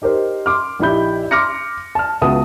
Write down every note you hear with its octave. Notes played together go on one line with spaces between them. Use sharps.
D#4 G4 A#4 C5
C6 D6 F6
A#1 D#4 E4 G4 B5 G6
C6 D6 F6 A#6 C#7
A5 F6
C#2 B3 F#4 E5 A5 D#6